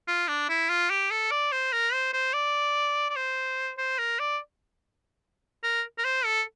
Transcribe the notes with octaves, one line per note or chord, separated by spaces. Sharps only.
F4
D4
E4
F4
G4
A4
D5
C5
A#4
C5
C5
D5
D5
C5
C5
A#4
D5
A#4
A#4
C5
A4